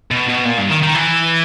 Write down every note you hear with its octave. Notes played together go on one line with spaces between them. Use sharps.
B2
B2
A#2
G2
D#3
D#3
E3